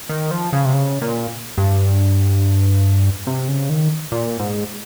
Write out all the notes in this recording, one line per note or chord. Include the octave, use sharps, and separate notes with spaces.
D#3
F3
C#3
C3
C#3
A#2
G2
C3
C#3
D#3
A#2
G#2